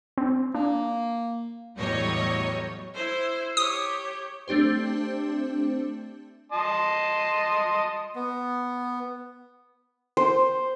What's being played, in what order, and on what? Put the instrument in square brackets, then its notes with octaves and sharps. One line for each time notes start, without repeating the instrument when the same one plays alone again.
[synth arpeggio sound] C4
[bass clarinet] A#3 [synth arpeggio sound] D4
[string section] E2 A2 F#3 G3 C#5 D#5
[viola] E4 C5
[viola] G4 C#5 [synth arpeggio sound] D#6
[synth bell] A3 C4 D4 G4 C5
[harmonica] D#5 A5 C6
[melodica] B3
[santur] C5